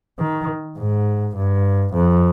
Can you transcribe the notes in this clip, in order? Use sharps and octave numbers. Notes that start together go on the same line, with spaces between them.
D#3
G#2
G2
F2